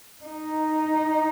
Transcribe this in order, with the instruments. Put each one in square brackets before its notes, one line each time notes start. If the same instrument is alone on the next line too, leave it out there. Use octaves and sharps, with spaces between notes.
[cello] D#4